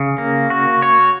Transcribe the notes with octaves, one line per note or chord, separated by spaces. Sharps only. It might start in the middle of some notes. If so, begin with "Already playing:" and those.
Already playing: C#3
A#3
F#4
C#5